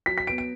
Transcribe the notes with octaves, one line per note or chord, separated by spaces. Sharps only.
F#3 B6
B6
B3 D7
D7